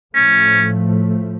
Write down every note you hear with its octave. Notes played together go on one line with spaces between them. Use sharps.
A2 F3 A3 C#4